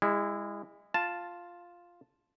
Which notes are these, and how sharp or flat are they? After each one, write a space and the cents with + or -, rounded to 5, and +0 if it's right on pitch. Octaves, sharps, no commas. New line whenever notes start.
G#3 -30 E4 +0
F4 +0 A5 +0